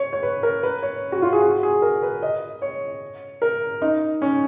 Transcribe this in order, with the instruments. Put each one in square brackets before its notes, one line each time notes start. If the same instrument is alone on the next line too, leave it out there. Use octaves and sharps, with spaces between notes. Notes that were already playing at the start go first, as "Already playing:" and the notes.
Already playing: [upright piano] C#5
C#5
B4
A#4
B4
C#5
F#4
F4
G#4
F#4
G#4
A#4
B4
D#5
C#5
A#4
D#4
C#4